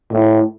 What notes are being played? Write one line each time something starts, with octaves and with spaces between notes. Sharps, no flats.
A2